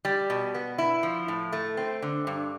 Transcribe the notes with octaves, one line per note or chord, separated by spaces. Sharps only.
G3
B2
B3
E4
F3
A2
A3
C4
D3
G2